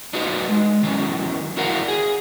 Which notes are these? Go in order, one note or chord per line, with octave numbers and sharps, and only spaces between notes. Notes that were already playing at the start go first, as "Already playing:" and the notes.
D4 D#4 F4 F#4 B4 D#5
G#3
D#3 E3 F#3 C#4
E4 F#4 A#4 D5 F5 F#5
G#4